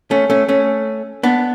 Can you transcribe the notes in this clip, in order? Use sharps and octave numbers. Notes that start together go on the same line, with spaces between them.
A3 C#4
A3 C#4
A3 C#4
B3 D4